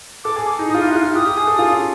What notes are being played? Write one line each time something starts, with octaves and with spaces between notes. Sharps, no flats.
A4 D6
G#4
G#4 D6
D#4
D#4 D#6
F4
E4 F6
F4 F#6
F4 F6
G4 D#6
G4
G#4
A4
F4
C#4